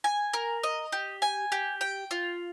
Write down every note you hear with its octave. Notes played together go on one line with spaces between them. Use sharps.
G#5
A#4
D#5
G4
G#5
G4
G5
F4